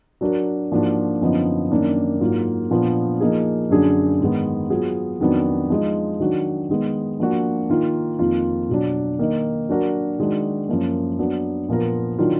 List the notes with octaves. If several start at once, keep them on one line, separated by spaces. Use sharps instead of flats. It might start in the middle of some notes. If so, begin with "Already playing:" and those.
F#3 D4 F#4 A#4
G#2 F3 A#3 D4 F#4
F#2 D3 F3 B3 D#4
F#2 D#3 A#3 D4
G#2 F#3 A#3 F4
A#2 F3 B3 D4 F4
F3 A#3 D#4 G#4
F#2 D3 F#3 D4 G#4
G#2 D#3 G#3 B3
F#3 B3 F4 G#4
F2 D#3 F#3 B3 D4
F3 G#3 D#4
D#3 F#3 D4 F#4
D#3 G#3 B3
F3 A#3 D4 F#4
D#3 A#3 F4 A#4
F2 D#3 A#3 F4
B2 F#3 D4
D#3 A#3 D#4
F#3 D4 F#4 A#4
D#3 G#3 D4 F#4
F#2 F3 A#3
F#3 B3 D4
A#2 F3 B3 F4 A#4
D#3 F#3 D4 F4